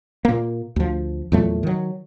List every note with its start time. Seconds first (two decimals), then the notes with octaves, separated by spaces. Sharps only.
0.25 A#2 A#3
0.76 D2 F3
1.32 E2 A#2 F#3 A3
1.63 D#3 F#3